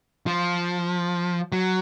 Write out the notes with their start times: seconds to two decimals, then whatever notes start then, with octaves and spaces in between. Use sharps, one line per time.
0.26 F3
1.52 F#3